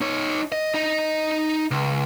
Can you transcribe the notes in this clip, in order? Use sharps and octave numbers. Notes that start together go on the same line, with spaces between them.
D#4 C#5
D#5
D#4 D#5
C#2